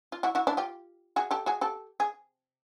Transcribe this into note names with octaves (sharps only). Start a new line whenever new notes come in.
F4
E4 F#4
E4 F#4
D4 E4
F4 G4
F#4 G#4
G4 A4
F#4 G#4
G4 A4
G#4